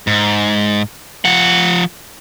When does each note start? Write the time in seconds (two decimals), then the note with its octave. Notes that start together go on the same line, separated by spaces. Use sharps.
0.07 G#2
1.25 F3 F#5